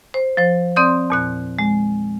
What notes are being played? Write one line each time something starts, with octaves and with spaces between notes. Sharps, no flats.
C5
F3 C5
C4 D5 C6 D#6 G6
E2 A#2 F#6
G#3